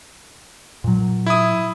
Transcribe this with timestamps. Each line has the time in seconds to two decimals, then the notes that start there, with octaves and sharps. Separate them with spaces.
0.84 A#2 F#3
1.26 E4 D#6